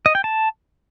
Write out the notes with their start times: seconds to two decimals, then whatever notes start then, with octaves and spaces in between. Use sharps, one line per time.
0.06 D#5
0.15 G5
0.24 A5